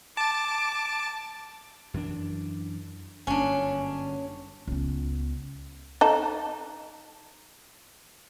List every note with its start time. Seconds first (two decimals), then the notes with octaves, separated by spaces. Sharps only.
0.17 A5 D6
1.94 F#2 E3 D4
3.27 G1 F#2 A#3 C#4 D4
4.67 C#2 B3
6.01 D#4 A4